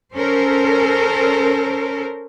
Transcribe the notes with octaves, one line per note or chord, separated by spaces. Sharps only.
C#4 A4 A#4 C5